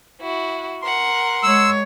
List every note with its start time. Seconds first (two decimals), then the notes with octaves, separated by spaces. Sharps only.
0.21 E4 F#4
0.82 A#4 F#5 C6
1.43 G#3 C#5 E6